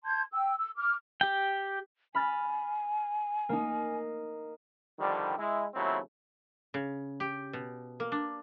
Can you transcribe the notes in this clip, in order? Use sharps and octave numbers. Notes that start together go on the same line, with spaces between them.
A5 C6 G6 G#6
G5 E6
E6
D6 F6
G4 G5
G#5 B5 F6 A6
A#3 D#4
D3 D#3 F3 G3
G#3 E4
D#2 C#3 F#3 A3 C4 E4
C#3
G4
B2
A#3
D4